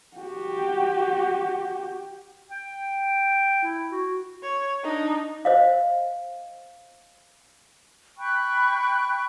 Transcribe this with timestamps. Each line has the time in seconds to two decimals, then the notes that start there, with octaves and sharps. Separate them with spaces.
0.17 F#4 G4
2.50 G5
3.64 E4
3.92 F#4
4.43 C#5
4.83 D4 D#4
5.45 C5 D#5 F5
8.18 G5 B5 C#6 F#6